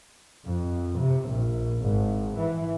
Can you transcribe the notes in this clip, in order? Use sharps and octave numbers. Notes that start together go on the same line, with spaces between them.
F2
C3
A#1
G#1
E3